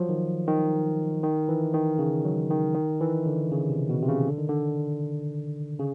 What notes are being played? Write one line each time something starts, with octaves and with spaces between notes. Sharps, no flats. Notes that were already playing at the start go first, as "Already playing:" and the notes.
Already playing: F3 F#3
D#3
D#3
D#3
E3
D#3
C#3
F#3
D#3
D#3
E3
D3
C#3
C3
B2
C3
C#3
D3
D#3
D3
C#3